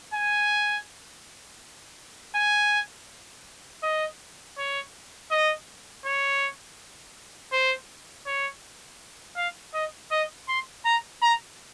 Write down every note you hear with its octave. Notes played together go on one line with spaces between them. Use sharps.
G#5
G#5
D#5
C#5
D#5
C#5
C5
C#5
F5
D#5
D#5
C6
A#5
A#5